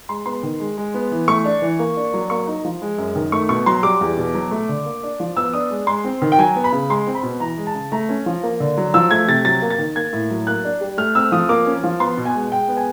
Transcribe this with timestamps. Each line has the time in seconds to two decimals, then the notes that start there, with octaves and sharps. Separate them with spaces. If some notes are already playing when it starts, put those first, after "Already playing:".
0.09 G#3 C6
0.26 B3 C6
0.43 D#3
0.60 G#3
0.78 G#3
0.94 B3
1.11 E3
1.28 A3 C#6
1.45 D4
1.62 E3
1.79 A#3
1.97 D4
2.14 F#3
2.30 A#3 C#6
2.47 D#4
2.65 F3
2.82 G#3
2.98 F#2
3.16 D#3
3.32 A3 C#6
3.49 B2 C#6
3.66 F#3 C6
3.83 G3 D6
4.01 E2
4.17 B2
4.35 F#3
4.51 A3
4.69 D3
4.85 A#3
5.03 D4
5.20 F3
5.37 B3 E6
5.54 D4 D#6
5.71 G#3
5.87 G#3 C6
6.04 C4
6.22 D#3
6.32 G5
6.38 F#3 G#5
6.56 B3
6.64 B5
6.72 C#3
6.90 G#3 C6
7.07 C4
7.15 B5
7.23 B2
7.40 E3 A#5
7.58 G#3
7.67 A5
7.75 C#3
7.92 A3 A#5
8.09 C#4
8.26 F3
8.43 A#3
8.60 D3
8.77 F#3
8.94 F3 E6
9.11 A3 G#6
9.28 C3 A6
9.45 F#3 A6
9.62 A#3
9.70 A6
9.79 D#3
9.96 A#3 G#6
10.13 A2
10.31 F#3
10.47 A#3 F#6
10.64 D4
10.81 G3
10.98 A3 F6
11.15 C4 E6
11.32 F3 D#6
11.49 A#3 D6
11.66 C#4
11.84 F3
12.00 B3 C6
12.17 B2
12.25 G#5
12.35 G#3
12.52 G#3 G5
12.68 B3
12.77 G#5